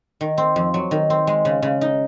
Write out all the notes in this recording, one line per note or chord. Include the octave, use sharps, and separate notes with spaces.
D#3
C4
F2
F#3
D#3
C4
G#3
C#3
C#3
D#4